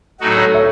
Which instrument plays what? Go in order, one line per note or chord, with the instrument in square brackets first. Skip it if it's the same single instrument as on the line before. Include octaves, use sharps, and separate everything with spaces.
[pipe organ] A2 F#3 A3 D#4 F#4
[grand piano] A4 C#5
C#5 E5